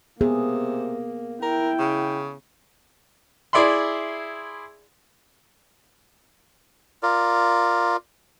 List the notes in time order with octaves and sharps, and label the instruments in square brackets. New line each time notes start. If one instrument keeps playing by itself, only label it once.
[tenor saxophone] C3 [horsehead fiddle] A#3 [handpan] B3 G#4
[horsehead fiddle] E4 G5 [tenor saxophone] A#4
[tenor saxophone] C#3
[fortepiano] E4 G#4 D5 E5 B5 C6
[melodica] F4 A#4 D5